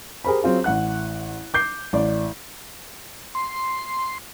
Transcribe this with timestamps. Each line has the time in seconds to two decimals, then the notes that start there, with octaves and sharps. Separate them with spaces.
0.24 G4 G#4 A#4 C5 B5
0.43 F#3 C4 F4 G#4
0.64 A1 F#5 F#6
1.54 D6 G6 C7
1.93 A1 D5
3.35 C6